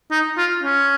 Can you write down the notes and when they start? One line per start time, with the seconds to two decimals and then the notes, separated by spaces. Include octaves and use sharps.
0.11 D#4
0.38 F4
0.63 C#4